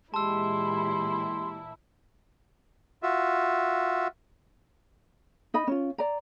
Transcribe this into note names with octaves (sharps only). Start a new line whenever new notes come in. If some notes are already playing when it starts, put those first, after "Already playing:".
A#2 E3 G#3 E4 G4 A5 C6 E6
F4 F#4 E5
D#4 D#5 B5
C#4 F4
D5 A#5